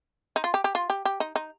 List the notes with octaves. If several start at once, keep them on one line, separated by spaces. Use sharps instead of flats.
D#4
F4
G4
G4
F4
G4
G4
D#4
D#4